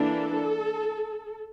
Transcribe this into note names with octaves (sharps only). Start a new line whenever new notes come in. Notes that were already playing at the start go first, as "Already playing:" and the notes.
Already playing: E3 A#3 D4 A4